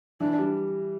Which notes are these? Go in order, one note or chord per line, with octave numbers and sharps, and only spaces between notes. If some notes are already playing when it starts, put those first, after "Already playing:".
E3 D4
G3